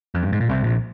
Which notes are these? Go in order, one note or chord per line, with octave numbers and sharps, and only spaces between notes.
F2
G2
G#2
A#2
C2 C3
A#1 A#2